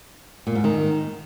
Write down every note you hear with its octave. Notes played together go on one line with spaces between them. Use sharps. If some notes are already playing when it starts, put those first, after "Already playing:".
A#2
G#2
D#3